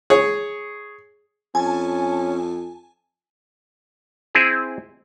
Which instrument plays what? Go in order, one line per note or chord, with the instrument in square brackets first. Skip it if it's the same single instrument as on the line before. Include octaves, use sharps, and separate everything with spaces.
[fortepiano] G#4 C#5
[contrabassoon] F2 [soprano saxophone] C#4 [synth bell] G#5 A5
[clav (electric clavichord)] C4 E4 G#4